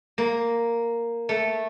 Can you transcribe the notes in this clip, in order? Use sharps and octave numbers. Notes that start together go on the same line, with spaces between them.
A#3
A3